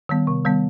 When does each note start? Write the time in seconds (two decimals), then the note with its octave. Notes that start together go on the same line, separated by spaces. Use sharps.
0.09 D#3 G3 B3
0.27 C3
0.45 D#3 G3 B3